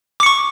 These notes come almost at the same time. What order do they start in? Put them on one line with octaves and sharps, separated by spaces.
D6 C#7 C#6